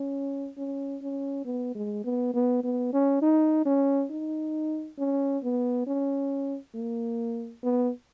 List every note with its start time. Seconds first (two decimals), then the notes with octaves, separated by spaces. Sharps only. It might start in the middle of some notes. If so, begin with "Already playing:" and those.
Already playing: C#4
0.57 C#4
1.02 C#4
1.45 B3
1.75 G#3
2.04 B3
2.34 B3
2.64 B3
2.93 C#4
3.22 D#4
3.66 C#4
4.11 D#4
4.99 C#4
5.43 B3
5.87 C#4
6.75 A#3
7.63 B3